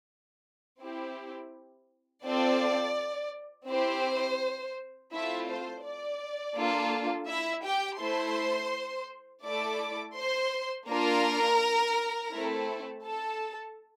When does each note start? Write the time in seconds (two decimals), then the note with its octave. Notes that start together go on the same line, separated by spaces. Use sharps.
0.80 C4 E4 G4
2.24 C4 F4 A4 D5
3.69 C4 E4 G4 C5
5.12 A3 C4 E4 F4 E5
5.49 C5
5.84 D5
6.56 A#3 D4 F4 A4
7.28 E4 E5
7.65 G4 G5
8.00 A3 E4 A4 C5 C6
9.44 A3 E4 A4 D5 D6
10.17 C5 C6
10.88 A#3 D4 F4 A#4 A#5
12.32 A3 C4 E4 A4
13.04 A4 A5